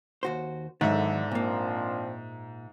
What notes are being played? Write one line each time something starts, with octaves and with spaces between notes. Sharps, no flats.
D#2 F#4 C5
E2 G#2 D3 D#3 F#3 E5
A#2 F3 A#3 C4 D4